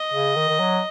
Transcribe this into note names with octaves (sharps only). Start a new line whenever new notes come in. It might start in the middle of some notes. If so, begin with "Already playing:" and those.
Already playing: D#5
C#3
D#3
D#3
F#3